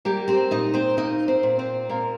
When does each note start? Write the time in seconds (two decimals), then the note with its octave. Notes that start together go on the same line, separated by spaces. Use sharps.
0.05 G3 A#3 G4
0.28 C4 C5
0.51 A#2 D#4 D#5
0.74 C4 C5
0.97 A#3 D#4 D#5
1.28 C4 C5
1.43 A#2
1.58 C4 C5
1.89 A#2 A#3 A#4